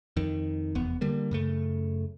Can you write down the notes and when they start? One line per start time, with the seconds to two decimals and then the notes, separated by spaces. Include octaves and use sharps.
0.17 F2 D#3
0.75 F1 E2 B3
1.01 D3 G3 A#3
1.31 F#2 C#3 A3